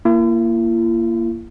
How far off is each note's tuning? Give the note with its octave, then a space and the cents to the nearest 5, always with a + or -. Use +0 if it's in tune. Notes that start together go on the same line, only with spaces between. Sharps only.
A#3 +0 E4 +45